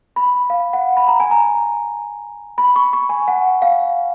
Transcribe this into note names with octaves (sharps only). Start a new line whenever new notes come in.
B5
F5
F#5
B5
A#5
G#5
A#5
B5
C#6
C#6
G#5
F#5
F5